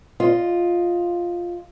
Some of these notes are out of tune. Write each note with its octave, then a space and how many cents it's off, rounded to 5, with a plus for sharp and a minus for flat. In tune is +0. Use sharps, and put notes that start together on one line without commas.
F4 +0 D#5 +0